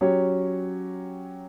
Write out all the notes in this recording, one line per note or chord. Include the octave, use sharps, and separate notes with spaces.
F#3 C#4 G4 C#5